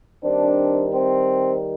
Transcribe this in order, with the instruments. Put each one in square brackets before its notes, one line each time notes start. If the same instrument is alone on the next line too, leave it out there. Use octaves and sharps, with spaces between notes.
[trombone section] D#3 G3 C4 D4
C4